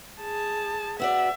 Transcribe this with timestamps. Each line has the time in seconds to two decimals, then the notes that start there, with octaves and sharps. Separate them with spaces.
0.21 G#4 A5
0.99 B3 F#4 D5 E5